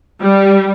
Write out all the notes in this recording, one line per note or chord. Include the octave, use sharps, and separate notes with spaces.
G3